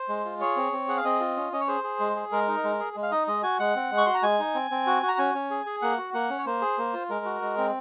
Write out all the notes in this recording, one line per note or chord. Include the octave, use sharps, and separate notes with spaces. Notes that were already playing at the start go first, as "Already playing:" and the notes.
Already playing: C5
G#3
F4
G#4 C#5
C4
C4
G#4 F#5
F5
C4 D#5
F4
C#4
C#4 D#5
C#5
G#4 C5
G#4
G#3
G#4
G#3 A#4
D#4
G#3
G#4
G#3
F5
D#4 D#5
G#3 D#5
F#4 G#5
G#3 F#5
C4
G#3
C#6
F#4 C6
A#5
G#3 G#5
D#4
C4
C4
F#4
F#4
A#5
C#4 G#5
C#4
G#4
G#4
A#3 F#5
F#4
A#3 F#5
C#4
C#5
A#3 C5
G#4
A#3
F4
G#3 A#4
F#4
G#3
C4